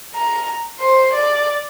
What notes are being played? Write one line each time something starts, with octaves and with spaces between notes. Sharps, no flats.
A#5
C5
D5